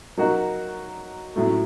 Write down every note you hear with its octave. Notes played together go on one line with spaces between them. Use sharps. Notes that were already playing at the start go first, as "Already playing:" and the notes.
F#3 A#3 D#4 F#4
A2 F#3 A3